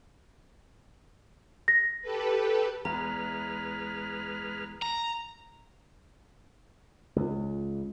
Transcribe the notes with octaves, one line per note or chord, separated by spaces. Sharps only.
A#6
G4 A4 B4
E2 G#3 B4 A#5 F6
A#5
C#2